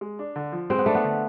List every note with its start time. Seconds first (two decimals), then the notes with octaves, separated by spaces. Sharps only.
0.01 G#3
0.19 D4
0.36 D3
0.52 F3
0.70 G#3 C4
0.78 B3
0.86 A3 D4
0.95 B3
1.04 D3